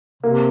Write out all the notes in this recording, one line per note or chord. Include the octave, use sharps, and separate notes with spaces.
C3 A#3